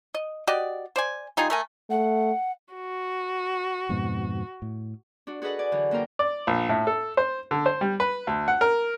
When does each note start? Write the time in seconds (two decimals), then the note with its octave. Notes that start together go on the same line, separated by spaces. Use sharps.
0.15 D#5
0.47 F#4 G4 D5 D#5
0.96 C5 D5 G#5
1.37 G3 D#4 F4 G#4
1.50 A3 A#4 G#5
1.90 A3 F#5
2.75 F#4
3.89 F2 G#2 B2
4.62 A2
5.27 D4 F#4
5.42 F#4 G#4 A4 B4 D#5 F#5
5.59 D5 G#5
5.72 D3 E3 F#3
5.91 F#2 A#3 F4 A#4 G5
6.19 D5
6.47 A#1
6.69 A2
6.87 A4
7.17 C5
7.51 D3
7.66 C5
7.81 G3
8.00 B4
8.27 D2
8.48 F#5
8.61 A#4